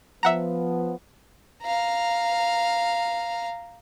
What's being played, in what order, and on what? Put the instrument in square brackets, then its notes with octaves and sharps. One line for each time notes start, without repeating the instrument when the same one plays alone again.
[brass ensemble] F3 B3 [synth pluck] E5 F#5 A#5
[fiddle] F5 A#5